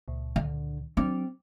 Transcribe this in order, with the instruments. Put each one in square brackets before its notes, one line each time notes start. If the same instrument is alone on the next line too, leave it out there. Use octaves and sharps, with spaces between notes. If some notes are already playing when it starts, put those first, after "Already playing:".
[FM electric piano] C#2 A#2
[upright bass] D3
[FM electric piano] F#3 D4 D6 [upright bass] C4